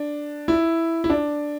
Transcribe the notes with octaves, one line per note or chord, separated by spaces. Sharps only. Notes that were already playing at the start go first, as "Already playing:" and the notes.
Already playing: D4
E4
E4
D4